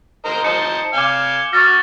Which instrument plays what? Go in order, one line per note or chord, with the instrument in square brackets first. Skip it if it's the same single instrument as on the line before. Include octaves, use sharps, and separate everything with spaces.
[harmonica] A#4 C5 D#5
[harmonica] D#4 C5 A5 [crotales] C#7
[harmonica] F5 G#5 [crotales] D6 G6 G7
[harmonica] F#4 F6 [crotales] C#6 A6 A#6